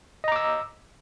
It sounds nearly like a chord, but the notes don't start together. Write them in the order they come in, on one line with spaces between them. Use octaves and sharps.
D#5 A#5 D6 E6